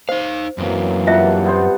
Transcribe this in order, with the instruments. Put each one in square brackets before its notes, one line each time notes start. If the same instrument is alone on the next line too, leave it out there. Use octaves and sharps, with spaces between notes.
[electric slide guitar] D#4 F5 [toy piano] C5
[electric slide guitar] F#2 C4 [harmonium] E3 F#3 A#3
[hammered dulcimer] G2 F#5 A5 [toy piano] F4 E5
[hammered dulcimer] C3 B3 C5